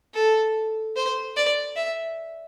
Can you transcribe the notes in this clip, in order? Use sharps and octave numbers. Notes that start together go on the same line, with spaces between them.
A4
C5
D5
E5